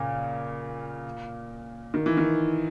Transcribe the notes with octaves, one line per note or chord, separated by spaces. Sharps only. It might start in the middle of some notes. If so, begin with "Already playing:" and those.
Already playing: A#2 C#3
D#3
E3
D#3